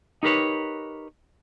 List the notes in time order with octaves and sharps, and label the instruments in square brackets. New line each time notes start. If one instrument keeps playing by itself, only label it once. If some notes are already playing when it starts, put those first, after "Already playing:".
[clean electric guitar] D#4 G4 A#4 B4 C#5